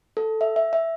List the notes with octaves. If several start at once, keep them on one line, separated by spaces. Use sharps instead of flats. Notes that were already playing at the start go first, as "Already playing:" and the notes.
A4
E5
E5
E5